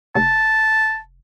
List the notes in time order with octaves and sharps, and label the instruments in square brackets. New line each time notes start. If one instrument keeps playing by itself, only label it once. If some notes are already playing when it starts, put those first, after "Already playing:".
[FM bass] F1 [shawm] A5